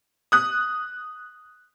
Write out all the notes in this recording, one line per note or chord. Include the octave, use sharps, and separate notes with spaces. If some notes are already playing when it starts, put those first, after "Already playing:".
D#6 F#6